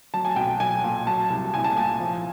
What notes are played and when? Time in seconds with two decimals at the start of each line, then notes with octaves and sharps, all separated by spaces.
0.14 F#3 A5
0.25 G#5
0.36 B1 G5
0.60 B1 G#5
0.84 A#2
1.07 F#3 A5
1.30 C2
1.54 C2 G#5
1.64 A5
1.77 A#2 G#5
2.00 F3